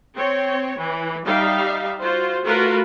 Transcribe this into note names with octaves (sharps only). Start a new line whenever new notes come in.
C4 C#5
E3
G3 D#4 E5 F5
F4 F#4 C5
A3 F4 F#4 A#4 B4